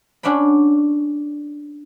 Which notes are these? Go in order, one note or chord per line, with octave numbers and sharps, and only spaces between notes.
C#4 D4 F#5 G5 B5